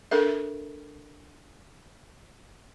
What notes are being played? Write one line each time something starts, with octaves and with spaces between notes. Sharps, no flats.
D4 A4 A#4 E5